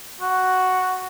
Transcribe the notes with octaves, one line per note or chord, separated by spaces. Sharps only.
F#4